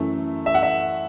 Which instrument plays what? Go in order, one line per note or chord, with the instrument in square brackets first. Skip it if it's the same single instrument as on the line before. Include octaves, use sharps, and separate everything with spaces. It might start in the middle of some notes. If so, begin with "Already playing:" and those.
Already playing: [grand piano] F#2 E3 A3
E5
F#5
E5